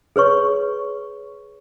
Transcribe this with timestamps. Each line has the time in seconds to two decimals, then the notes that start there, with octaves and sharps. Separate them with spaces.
0.16 G#4 B4 C#5 C#6